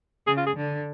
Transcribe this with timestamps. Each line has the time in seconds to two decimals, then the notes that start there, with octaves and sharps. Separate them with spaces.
0.27 C#3 G#4
0.37 F4
0.46 G#4
0.57 D3